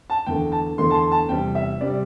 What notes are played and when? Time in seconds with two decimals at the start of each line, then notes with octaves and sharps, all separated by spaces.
0.10 A5
0.26 E2 D3 A3 G5
0.52 A5
0.78 E2 D3 A3 C6
0.90 A5
0.94 C6
1.12 A5
1.29 E2 C3 G3 G5
1.55 E5
1.81 C3 G3 D5